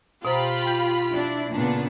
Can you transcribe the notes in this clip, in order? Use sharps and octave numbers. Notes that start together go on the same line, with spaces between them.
B2 F4 G4 C5 A#5 B5
G5 G6
D4 E4 D5
A#2 C#3 B3 D4